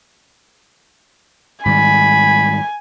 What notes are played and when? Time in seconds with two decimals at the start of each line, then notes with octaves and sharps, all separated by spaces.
1.65 G#2 D#3 G3 G#5 B5